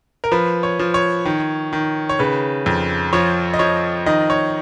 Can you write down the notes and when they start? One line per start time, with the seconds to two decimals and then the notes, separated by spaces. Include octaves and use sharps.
0.24 A#4
0.32 F3 B4
0.63 C#5
0.79 F3
0.94 C#5
1.25 D#3
1.73 D#3
2.09 C#5
2.19 C#3 B4
2.66 F2
3.13 F3 C#5
3.53 D#5
3.59 F3 C#5
4.06 D#3 D#5
4.30 C#5